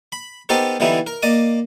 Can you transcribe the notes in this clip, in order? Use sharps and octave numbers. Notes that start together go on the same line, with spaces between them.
B5
B3 D#4 G4 A4 A#4 C5
D3 E3 G3 B3 D#4 E4
A#4
A#3 D5 D#5 D#6